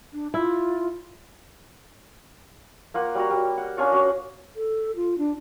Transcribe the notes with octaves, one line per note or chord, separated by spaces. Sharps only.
D4
E4 F4
A#3 F4 F#5
G3 F#4 A#5
G3
F#5
C#4 D4 F4 C#5
C#4 F#4
A4
F4
D4